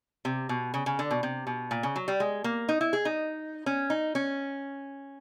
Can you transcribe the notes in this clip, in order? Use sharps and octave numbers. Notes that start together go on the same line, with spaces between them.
C3
B2
C#3
C#3
D3
B2
C3
B2
A#2
C#3
F#3
G3
G#3
A#3
D#4
E4
G#4
D#4
C#4
D#4
C#4